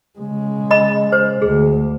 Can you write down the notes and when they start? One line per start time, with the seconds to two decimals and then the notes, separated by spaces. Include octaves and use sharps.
0.19 C#3 G#3
0.71 D#5 B5 D#6
1.12 C5
1.42 D2 G#4